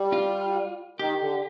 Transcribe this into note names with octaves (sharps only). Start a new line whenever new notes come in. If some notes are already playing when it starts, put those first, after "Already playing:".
Already playing: G3
F4
D#3 G4
D3